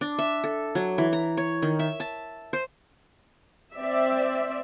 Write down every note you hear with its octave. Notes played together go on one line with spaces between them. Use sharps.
D4
E5
A4
F#3
E3
A#5
C#5
D#3
E5
A5
C5
C4 D5 E5